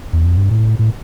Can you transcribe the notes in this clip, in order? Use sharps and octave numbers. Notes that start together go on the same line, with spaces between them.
E2
F2
G2
A2
A2